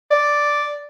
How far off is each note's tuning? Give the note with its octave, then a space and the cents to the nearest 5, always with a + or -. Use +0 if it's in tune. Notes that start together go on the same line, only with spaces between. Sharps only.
D5 +0